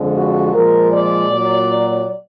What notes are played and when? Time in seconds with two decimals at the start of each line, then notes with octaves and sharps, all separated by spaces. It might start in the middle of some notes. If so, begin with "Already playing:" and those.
Already playing: F2 D3 F3 G#3
0.16 F#4
0.53 A#2 F3 G#3 A#4
0.90 D5
1.28 A#2 F#3